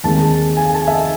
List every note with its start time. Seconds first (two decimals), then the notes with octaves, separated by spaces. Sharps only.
0.04 D#2 D#3 G#3 C4 A5
0.57 G#5
0.74 A5
0.87 E5
0.92 D#5